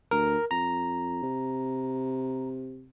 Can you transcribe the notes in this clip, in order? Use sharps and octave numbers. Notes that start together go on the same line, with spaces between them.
D2 A#4
F2 A#5
C3